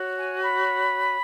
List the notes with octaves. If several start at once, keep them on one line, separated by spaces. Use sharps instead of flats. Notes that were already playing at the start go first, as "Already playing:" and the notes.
Already playing: F#4 C#5
G#5
B5